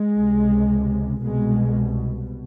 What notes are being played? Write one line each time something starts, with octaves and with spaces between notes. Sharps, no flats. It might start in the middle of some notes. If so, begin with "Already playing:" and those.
Already playing: G#3
C#2 C3
C2 B2 G#3